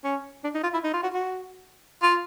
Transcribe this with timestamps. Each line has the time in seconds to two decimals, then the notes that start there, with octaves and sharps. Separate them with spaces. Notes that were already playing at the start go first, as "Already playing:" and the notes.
0.04 C#4
0.44 D4
0.54 D#4
0.63 F4
0.73 E4
0.84 D#4
0.93 F4
1.03 F#4
1.13 F#4
2.03 F4